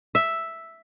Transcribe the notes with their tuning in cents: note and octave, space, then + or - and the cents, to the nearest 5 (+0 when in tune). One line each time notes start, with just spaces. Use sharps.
E5 +0